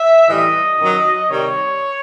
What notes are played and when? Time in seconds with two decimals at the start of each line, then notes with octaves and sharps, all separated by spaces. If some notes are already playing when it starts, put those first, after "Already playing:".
Already playing: E5
0.27 A2 E3 G3 D#5
0.78 F#2 D#3 F#3
1.29 C3 D#3 G3 C#5